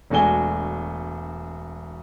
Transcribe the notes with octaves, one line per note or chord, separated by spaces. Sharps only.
E1 A3 D4 F#4 G#5 G7